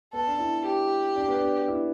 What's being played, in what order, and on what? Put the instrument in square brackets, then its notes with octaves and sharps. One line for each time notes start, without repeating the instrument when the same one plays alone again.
[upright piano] B3 [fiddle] A4
[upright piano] D4
E4
[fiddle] G4
[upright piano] D4
B3
D4
E4